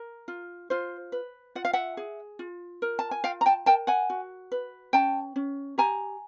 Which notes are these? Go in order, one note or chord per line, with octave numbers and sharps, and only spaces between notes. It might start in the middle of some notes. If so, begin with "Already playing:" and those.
Already playing: A#4
F4
F4 C5
B4
F4 F#5
F5
E5 F#5
G#4
F4
A#4
A5
G#5
F4 F5 G5
A#5
G5 A5
A#4 G5 A5
F#5 G#5
F#4
B4
C#4 G5 A5
C#4
G4 G#5 A#5